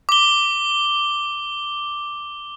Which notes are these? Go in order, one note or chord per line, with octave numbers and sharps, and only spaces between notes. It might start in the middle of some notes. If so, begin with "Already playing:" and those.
D6 G7